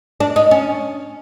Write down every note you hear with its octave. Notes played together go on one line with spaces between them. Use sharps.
D4
D#4
C#4